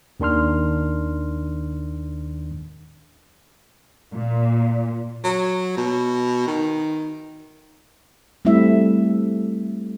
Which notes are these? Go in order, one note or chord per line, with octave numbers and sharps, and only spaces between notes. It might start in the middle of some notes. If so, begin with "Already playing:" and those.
D#2 D#3 D4 C6 F6
A#2
F#3
B2
D#3
G3 A3 C4 E4 E5